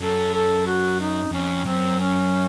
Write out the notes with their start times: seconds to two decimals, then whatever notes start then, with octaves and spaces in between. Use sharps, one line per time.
0.01 F#2 A4
0.34 A4
0.67 F#4
1.00 D#4
1.32 F2 C#4
1.65 F#2 C4
1.99 C#4